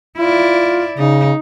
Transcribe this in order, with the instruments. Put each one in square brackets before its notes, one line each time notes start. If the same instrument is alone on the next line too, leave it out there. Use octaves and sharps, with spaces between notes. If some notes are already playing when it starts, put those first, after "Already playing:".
[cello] E4 D5 [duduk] F4
[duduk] C#3 [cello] D#4